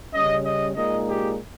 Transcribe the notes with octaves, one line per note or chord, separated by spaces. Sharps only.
C#3 G3 C#4 D#5
D#5
A#2 G#3 D#4 D#5
G4